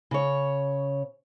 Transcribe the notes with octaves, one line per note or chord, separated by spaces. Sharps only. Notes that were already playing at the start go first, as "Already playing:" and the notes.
C#3 C#5